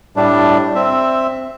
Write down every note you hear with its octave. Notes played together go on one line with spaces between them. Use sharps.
A2 G3 A3 D4
C4 E5